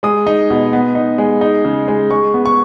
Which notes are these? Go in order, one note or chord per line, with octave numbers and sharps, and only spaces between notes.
G#3 D#6
D#4
B2
B3
D#4
G#3
D#4
C#3
G#3
G#3 C#6
B3
C#6